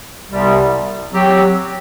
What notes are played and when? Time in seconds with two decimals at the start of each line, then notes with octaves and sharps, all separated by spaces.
0.29 C2 C3 G3 B3
1.12 F#3 C4 G4